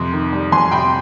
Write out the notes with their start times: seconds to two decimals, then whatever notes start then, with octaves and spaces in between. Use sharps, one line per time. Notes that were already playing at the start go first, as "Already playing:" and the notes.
Already playing: F2 C3 C6
0.12 D#3
0.33 G3
0.52 F2 G#5 C6
0.71 C3 G5 B5